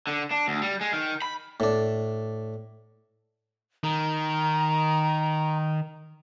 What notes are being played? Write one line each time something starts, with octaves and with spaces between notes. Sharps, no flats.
D3
D4
D2
G3
G#3
D#3
B5
A2 D4
D#3 A#5